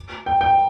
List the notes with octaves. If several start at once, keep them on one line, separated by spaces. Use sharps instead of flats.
G5
G5